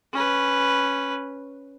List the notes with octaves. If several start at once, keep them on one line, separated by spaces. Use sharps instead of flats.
C#4 B4